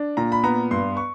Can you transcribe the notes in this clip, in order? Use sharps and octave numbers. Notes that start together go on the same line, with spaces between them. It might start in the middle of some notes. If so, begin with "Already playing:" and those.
Already playing: D4
A#2 A#5
B5
B3 A#5
G2 C6
C#6